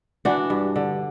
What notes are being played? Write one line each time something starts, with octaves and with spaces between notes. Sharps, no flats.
E3 D4 F#4
G2
D3